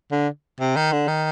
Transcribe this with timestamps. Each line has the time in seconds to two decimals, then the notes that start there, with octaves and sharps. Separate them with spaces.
0.12 D3
0.60 C3
0.76 D#3
0.92 D3
1.08 D#3